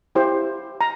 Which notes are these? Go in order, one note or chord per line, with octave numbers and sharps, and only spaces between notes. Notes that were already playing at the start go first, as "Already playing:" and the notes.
E4 G4 C5
A#5